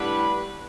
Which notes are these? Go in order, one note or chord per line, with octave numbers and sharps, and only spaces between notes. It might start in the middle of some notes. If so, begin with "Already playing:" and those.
Already playing: A2 G3 B3 D4 B4